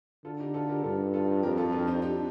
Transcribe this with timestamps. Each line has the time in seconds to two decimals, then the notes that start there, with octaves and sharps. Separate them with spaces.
0.25 D3 F4 A4
0.40 D#4 G4
0.54 F4 A4
0.69 G4 A#4
0.84 G2 F4 A4
1.14 F4 A4
1.43 F2 G4 A#4
1.58 F4 A4
1.73 D4 F4
1.87 C4 D#4
2.02 D#4 G4